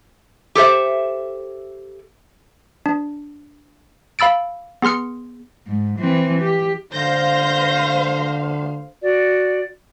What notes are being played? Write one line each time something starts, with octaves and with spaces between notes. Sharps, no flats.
G4 A4 C5 E5
D4
F5 B5 E6 A6 D7
B3 G#4 C6 F6 C#7
G#2
E3 C4
G4
D3 C5 F5 G6 A#6
F#4 D5